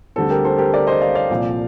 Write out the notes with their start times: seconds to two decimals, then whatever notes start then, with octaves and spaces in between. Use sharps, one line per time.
0.16 D2 D3 G3 C4 A4
0.30 G4 A#4
0.45 A4 C5
0.58 G4 A#4
0.74 A#4 D5
0.87 C5 D#5
1.01 D5 F5
1.15 D5 F5
1.30 C2 A#2 F3